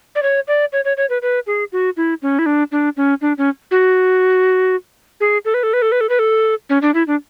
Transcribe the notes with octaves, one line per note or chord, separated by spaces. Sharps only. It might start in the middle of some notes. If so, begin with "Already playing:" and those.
D5
C#5
D5
C#5
C#5
C#5
B4
B4
G#4
F#4
E4
C#4
E4
D4
D4
C#4
D4
C#4
F#4
G#4
A4
B4
A4
B4
A4
B4
A4
B4
A4
C#4
D4
E4
D4